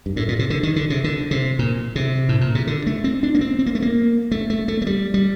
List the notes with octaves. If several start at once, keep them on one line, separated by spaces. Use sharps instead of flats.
G2
A2
A#2
C3
D3
D#3
D3
C3
D3
C3
A#2
C3
A2
A#2
C3
D3
A3
C4
D4
A#3
C4
C4
A#3
A3
A#3
A3
A3
A3
A3
G3
G3